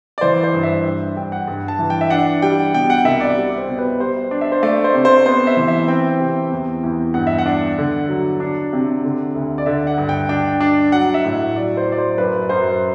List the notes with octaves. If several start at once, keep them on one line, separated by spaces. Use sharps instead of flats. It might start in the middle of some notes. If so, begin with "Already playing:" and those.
D5
E3 C5
C5
G2
E5
G2
G2 G5
F#5
G2
A5
E3
G5
E5
D4 F#5
G3 G5
B2 G5
F#5
C2 E5
D5
G3
C5
B2
B4
G3 C5
D4
E5
C5
A3 D5
C5
C3
C5
B3 C5
E5
E3
E5
C4 G5
C3
E2
E2
G2 F#5
E5
F#5
D4
D3
F#3
D4
C3
D3
D2
D5
D3 E5
F#5
G2
G5
D4 G5
D4
F#3 F#5
E5
A2
E5
F#3 D5
C5
F#3
D5
C5
F#2 B4
F#2 C5